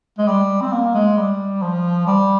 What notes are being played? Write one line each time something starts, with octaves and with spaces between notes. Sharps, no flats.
G#3
G3
C4
A#3
G#3
G3
F3
G3